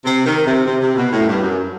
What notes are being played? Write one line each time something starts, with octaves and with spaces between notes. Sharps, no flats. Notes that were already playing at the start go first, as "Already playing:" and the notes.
C3
D#3
C3
C3
C3
B2
A2
F#2
G2
F#2